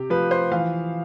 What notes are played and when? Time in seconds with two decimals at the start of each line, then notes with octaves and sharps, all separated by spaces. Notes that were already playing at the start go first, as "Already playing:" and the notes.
Already playing: C3 G4
0.10 F3 B4
0.31 C5
0.52 E3 F5